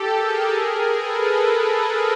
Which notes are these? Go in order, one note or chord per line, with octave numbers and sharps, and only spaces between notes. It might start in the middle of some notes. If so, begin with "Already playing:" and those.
Already playing: G4 A4
G#4 A#4
A4 B4